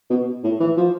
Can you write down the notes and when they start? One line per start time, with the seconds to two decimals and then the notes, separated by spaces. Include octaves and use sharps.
0.10 B2
0.43 A2
0.60 E3
0.77 F3